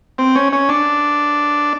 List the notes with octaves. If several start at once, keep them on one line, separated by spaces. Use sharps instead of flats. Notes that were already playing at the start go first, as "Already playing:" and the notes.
C4
C#4
C#4
D4